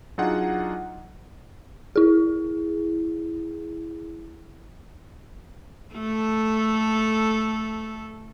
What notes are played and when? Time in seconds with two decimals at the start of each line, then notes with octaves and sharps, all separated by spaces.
0.18 F#3 D4 D#4 F4 G#4 F#5
1.96 E4 G#4
5.94 A3 A4